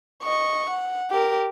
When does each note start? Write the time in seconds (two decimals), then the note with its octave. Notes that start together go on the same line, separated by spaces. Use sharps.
0.23 D#5 C#6
0.69 F#5
1.10 G4 A#4